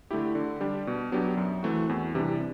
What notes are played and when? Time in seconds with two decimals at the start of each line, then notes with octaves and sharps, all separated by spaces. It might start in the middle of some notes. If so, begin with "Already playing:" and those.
0.11 D3 A3 E4 G4
0.35 D3
0.61 G3 D4 G4
0.87 B2
1.12 F#3 B3 D4 G4
1.37 F#2
1.63 E3 A3 C4 F#4
1.89 E2
2.14 C3 E3 G3 D4